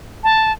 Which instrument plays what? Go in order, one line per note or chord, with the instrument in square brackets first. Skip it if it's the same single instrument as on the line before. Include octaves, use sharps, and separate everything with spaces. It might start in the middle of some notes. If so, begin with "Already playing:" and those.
[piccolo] A5